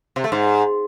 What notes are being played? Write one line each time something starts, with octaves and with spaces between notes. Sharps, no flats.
C3
A3
G#2